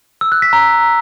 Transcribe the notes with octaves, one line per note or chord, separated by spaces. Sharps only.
E6
F#6
B6
A#5